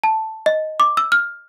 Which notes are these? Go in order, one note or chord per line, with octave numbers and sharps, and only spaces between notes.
A5
D#5
D6
E6
F6